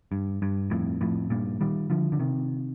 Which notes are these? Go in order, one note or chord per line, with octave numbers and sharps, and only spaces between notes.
G2
G2
F2 A2
F2 A2
G2 A#2
D#3 G3
D3 F3
D3
C3 D#3